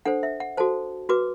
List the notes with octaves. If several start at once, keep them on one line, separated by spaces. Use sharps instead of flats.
D4 A4 C5 F#5
E5
F#5
F#4 A4 C5 A5
F#4 B4 D6